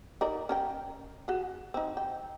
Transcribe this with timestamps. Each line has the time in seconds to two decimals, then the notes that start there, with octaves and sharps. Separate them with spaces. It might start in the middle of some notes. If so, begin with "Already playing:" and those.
0.21 D#4 A#4 D5
0.49 C#4 A#4 G5
1.28 F#4 G#4
1.74 C4 D#4
1.97 G5